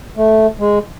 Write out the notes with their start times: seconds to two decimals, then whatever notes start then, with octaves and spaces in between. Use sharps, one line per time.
0.17 A3
0.59 G#3